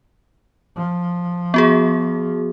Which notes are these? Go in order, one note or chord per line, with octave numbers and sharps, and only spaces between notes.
F3
B3 F#4 G#4